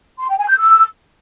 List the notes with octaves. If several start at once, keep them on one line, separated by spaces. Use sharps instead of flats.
C6
G5
G#5
G6
E6